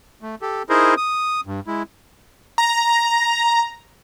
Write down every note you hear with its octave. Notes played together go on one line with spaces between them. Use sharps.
A3
G4 A4
D#4 E4 G#4 A#4 C5 D#5
D#6
G2
G#3 E4
A#5